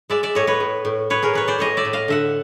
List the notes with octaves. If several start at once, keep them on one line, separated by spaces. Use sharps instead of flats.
G#3 D5 E5
D5 E5
A2 C#5 D#5
B4 C#5
A2
A2
A2 B4 C#5
G#4 A#4
E3 B4 C#5
C5 D5
A2 C#5 D#5
D5 E5
A2
D#5 F5
D3 E5 F#5